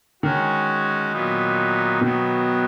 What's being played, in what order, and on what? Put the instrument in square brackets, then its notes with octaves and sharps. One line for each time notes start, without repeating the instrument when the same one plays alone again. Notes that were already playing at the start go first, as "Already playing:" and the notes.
[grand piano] D#3 [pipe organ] G#3 C#4 F#4
[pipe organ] A#2 F#3 B3 D#4
[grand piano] B2 [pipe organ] D#3 F#3 B3